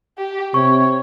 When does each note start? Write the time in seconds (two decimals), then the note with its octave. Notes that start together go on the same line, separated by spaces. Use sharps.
0.18 G4
0.54 C3 C#5 C#6